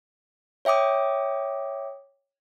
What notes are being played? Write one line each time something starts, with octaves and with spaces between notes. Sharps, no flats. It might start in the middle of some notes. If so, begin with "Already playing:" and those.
C#5 E5 G5 D6 D#6